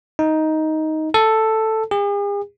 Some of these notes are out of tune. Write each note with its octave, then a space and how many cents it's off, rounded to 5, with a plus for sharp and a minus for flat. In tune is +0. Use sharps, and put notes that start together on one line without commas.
D#4 +10
A4 +5
G#4 -45